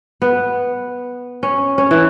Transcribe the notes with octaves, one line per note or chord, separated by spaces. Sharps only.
B3
C#4
C#4
E3